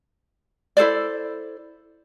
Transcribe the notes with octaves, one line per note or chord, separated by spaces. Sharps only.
E4 A4 C5 D5